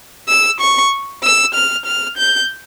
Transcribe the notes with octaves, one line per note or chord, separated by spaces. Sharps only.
E6
C#6
E6
F6
F6
G6